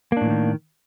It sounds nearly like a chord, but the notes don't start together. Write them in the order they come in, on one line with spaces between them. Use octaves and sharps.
A#3 D4 A2 E3 D#3